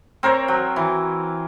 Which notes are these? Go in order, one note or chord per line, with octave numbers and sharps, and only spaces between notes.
C4 A#4 C5 C#5
F#3
E3